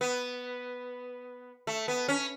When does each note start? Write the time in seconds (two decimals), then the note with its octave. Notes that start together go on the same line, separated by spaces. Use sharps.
0.01 B3
1.67 A3
1.88 B3
2.08 C#4